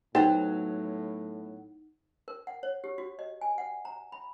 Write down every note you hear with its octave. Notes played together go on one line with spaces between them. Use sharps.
A2 F#3 B3 D#4 A4 C5 G5
A#4
F#5
C#5
G4
F#4
D#5
G#5
F#5
A#5
B5